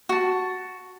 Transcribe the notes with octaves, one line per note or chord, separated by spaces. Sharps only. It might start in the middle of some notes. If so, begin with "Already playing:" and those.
F#4 A5